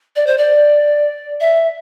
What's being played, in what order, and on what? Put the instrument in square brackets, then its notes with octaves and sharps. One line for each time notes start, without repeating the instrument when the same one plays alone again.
[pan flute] D5
C5
D5
E5